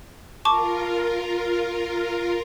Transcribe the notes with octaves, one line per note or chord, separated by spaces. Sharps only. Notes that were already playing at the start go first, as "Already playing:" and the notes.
F4 A#4 A5 C#6 D6